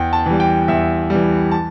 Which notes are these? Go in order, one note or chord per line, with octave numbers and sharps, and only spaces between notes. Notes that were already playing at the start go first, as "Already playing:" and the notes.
Already playing: E2 G5
A5
E3 G3
G5
E2 E5
E3 G3
A5